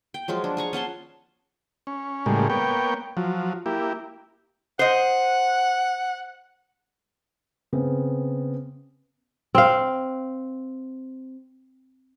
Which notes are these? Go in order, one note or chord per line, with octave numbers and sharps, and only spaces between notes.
G5
F3 F#3 G#3 F4
D4
G#4 A#5 C#6
C#4 F#5 A5 C6
C#4
A2 C#3 G3 G#3 A#3
A#3 B3 C#5 G5
F3 F#3
A#3 E4 G4
C5 D#5 F#5
C#3 B3 C4
C4 F5